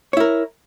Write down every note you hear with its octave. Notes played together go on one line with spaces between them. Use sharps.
E4 A#4 C#5